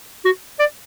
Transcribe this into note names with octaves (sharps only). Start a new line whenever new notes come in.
F#4
D5